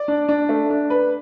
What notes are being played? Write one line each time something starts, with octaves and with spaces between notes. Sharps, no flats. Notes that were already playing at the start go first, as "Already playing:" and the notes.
Already playing: D5
D4
D4
A3
D4
B4